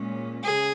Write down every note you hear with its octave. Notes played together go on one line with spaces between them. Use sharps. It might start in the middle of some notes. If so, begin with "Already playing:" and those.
Already playing: A#2 G#3 C#4
C#3 G#4